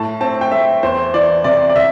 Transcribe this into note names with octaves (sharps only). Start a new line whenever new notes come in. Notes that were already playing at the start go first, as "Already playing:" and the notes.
Already playing: A2 A5
C4 A5
G5
A3 E5
E2 C5
E3 D5
C3 D5
D5
C3 E5